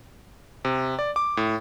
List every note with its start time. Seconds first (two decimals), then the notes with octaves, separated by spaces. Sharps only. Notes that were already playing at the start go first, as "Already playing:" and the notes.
0.65 C3
0.99 D5
1.16 D6
1.37 A2